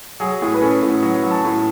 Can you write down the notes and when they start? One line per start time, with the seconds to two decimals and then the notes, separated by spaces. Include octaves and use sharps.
0.20 F#3 G#4
0.42 A2 G#4
0.54 B4
0.62 C#4 A4
0.82 A2
1.03 F#3
1.23 F#3
1.31 A5
1.45 A2